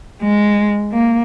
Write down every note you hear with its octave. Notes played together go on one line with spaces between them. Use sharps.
G#3
A#3